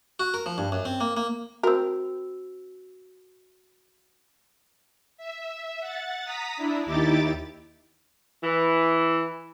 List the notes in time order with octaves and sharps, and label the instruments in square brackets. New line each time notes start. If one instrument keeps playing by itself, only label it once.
[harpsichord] F#4
A#4
F3
G2
F#2
C4
A#3
A#3
[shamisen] C4 A#4 [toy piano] F#4 E6
[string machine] E5
F#5 A6
A#5 D#6 B6
D4 E4
D#2 D#4 E4 G4 D6 A6
[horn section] E3